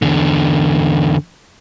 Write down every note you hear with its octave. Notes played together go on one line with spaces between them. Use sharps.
E2 D3